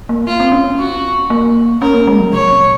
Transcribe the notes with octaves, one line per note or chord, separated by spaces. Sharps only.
A#3
F4
C4
C#4
F#4
A#3
C#4 A#4
A#3
G#3
F#3
C3 C#5
A#2